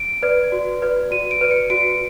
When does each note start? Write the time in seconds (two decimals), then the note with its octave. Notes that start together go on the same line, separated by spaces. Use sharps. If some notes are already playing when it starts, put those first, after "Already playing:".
Already playing: D7
0.23 B4 D5
0.52 F#4
0.82 B4 D5
1.11 F#4 D#7
1.31 D7
1.41 B4 D5
1.51 C#7
1.70 F#4 D7